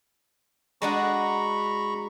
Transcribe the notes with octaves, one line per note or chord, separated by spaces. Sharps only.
G#3 D4 F#4 A#5 B5 C#6